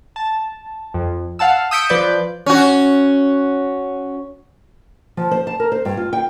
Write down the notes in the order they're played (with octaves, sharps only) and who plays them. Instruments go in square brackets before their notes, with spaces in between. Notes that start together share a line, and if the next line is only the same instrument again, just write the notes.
[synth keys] A5
F2
F5 F#5 A5 E6
D#6 E6 G6 B6 C#7 D7
F3 B4 D5 G6
[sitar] C#4 F#4
[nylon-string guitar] F3
C5
A5
A#4
C5
G2
F4
G5